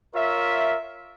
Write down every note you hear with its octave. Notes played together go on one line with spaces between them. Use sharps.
F4 A#4 C#5 E5